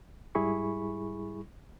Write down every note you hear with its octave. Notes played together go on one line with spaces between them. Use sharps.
G#2 G3 E4 G#4 B5 C#6